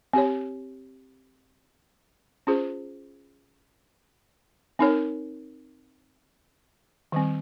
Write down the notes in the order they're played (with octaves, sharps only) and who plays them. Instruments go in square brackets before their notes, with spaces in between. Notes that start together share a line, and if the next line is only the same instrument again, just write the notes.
[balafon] C4 G4 C#5
C#4 F4 G#4 C5
C4 D#4 A#4 C#5
D#3 G3 C4